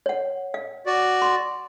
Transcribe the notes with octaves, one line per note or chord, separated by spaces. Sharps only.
C#5 F#5
F5
F#4 D5
C6